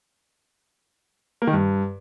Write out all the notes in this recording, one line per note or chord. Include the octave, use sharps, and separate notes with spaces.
A#3
D#3
G2